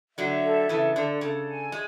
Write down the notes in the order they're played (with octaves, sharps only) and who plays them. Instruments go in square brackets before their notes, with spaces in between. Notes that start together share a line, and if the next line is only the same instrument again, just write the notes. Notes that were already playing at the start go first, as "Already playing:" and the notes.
[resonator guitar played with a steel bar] D3 F#3 [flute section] E5
[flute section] A4
[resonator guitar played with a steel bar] C#3 E3 [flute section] A4
[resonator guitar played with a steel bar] D3 [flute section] A4
[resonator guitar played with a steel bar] C#3 [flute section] A4
[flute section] G#5
[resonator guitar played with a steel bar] G#3